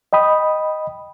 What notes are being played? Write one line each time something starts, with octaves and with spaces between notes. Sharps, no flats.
D#5 G5 B5 D#6